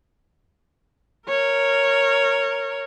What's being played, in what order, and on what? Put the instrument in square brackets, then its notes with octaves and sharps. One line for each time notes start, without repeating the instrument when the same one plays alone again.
[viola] A#4 C#5